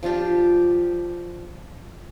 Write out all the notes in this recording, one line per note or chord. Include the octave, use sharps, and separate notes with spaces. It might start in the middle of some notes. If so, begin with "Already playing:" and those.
F3 D4 F4 G4